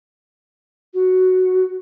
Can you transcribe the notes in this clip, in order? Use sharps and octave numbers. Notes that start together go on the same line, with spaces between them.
F#4